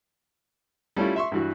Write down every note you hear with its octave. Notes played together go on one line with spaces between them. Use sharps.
G3 A3 C#4 E4 F4
E5 C6 C#6
G2 E3 F#4